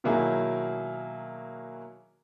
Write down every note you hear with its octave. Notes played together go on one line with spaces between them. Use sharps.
B2 D#3 F#3 A#3 E4 G#4